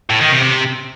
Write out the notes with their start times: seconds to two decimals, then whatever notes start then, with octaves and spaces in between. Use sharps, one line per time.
0.10 A2
0.21 D#3
0.32 C3
0.43 C3